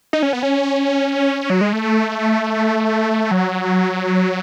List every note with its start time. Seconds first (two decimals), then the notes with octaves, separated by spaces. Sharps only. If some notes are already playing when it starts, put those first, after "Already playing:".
0.13 D#4
0.23 C#4
0.33 B3
0.43 C#4
1.50 F#3
1.61 G#3
1.73 A3
3.31 F#3